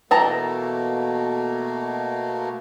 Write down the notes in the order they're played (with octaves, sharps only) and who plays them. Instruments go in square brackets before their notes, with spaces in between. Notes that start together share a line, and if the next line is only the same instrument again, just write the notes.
[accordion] B2 A3 A#3 [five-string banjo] E3 A5 A#5